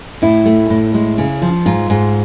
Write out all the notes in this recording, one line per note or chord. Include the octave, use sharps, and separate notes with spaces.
A2 E4
A3
A2
G#3
C#3
F3
G#2 F4
G#2